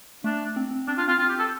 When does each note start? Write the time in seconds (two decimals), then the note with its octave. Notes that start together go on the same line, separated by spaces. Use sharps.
0.24 A3 D4
0.56 C4
0.71 C4
0.87 C4 D4
0.97 D4 F4
1.08 C4 F4
1.19 C4 F4
1.29 G4
1.39 A4